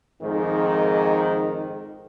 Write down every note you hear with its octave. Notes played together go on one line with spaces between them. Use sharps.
F2 G#2 D#3